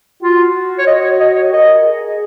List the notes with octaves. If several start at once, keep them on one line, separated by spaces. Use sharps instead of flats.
F4 F#4
C#5
D#5
C#5
D#5
C#5
A#4 D#5
G#4